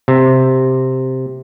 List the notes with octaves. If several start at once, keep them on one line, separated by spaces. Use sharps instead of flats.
C3